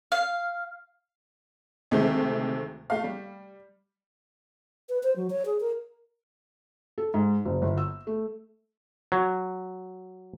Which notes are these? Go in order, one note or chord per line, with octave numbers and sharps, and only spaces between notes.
F5
D2 C3 D#3 G#3 A3 C4
A3 F5
G3
B4
C5
F#3
C#5
G#4
A#4
A4
G#2
F#1
G1
E6
A3
F#3